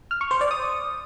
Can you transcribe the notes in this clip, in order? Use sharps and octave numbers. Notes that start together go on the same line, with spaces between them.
F6
C#6
C5
D5
D#6